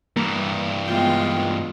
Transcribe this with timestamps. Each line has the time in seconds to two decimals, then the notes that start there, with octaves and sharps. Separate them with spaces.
0.17 G2 E3 A#3
0.88 G#3 B3 F4 G5